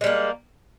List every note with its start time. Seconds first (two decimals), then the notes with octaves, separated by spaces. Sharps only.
0.01 G#3
0.04 G3
0.07 A#3